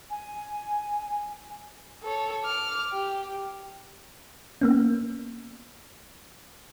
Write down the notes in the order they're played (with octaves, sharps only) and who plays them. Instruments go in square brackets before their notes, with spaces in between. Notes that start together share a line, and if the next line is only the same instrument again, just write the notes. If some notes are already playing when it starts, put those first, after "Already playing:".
[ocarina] G#5
[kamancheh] A4 C#5
D6 F6
G4
[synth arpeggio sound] A#3 B3 C#4